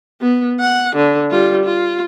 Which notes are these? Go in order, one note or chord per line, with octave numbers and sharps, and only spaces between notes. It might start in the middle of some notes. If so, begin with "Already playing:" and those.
B3
F#5
D3
G3 F4
F4